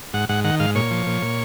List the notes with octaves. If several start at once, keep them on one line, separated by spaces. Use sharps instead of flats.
G#2 F#5
G#2 F#5
D#3 F#5
G#2 F5
A#2 C#5
F3
A#2
A#2